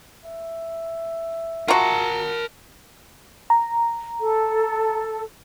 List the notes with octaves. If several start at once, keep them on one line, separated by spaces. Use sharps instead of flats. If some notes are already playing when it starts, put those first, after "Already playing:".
E5
F4 F#4 A#4 A5 A#5
A#5
A4